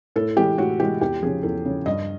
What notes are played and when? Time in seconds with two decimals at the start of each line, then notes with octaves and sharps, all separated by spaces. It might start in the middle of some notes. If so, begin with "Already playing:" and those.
0.16 A2 A4
0.37 E3 G#3 G4
0.58 A2 F#4
0.80 E3 G#3 G4
1.01 E2 G4
1.22 C#3 F3 G#4
1.43 E2 A4
1.65 C#3 F3
1.86 G2 D#5